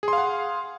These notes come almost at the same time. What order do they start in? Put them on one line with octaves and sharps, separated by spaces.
G#4 C6 F5 F#5